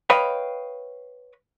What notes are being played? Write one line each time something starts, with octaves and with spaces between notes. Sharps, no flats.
B4 C#5 D#5 F5 G5 B5